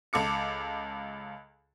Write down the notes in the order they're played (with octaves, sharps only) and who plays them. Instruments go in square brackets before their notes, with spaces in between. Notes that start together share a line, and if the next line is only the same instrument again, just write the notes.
[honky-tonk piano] C#2 A4 D6 C#7